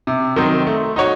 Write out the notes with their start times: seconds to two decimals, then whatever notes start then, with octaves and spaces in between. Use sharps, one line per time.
0.07 C3
0.36 D#3 F#3 C4 D#4
0.67 A3
0.96 D#4 F#4 C#5